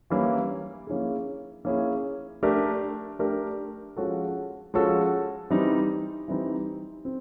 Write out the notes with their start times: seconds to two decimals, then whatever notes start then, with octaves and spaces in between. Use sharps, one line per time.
0.10 E3 G3 A#3 C#4 E4
0.87 A#3 C#4 E4 G#4
1.65 A#3 C#4 E4 G#4
2.43 A3 D4 G4 A#4
3.19 A3 D4 G4 A#4
3.96 F3 G#3 C#4 F#4 A4
4.74 F3 G#3 C#4 F#4 A4
5.50 E3 G3 C4 D#4
6.28 E3 G3 C4 D#4
7.05 C4